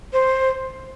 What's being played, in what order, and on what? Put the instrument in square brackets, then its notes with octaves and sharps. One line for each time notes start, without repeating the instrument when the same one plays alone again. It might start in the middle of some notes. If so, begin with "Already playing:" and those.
[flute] C5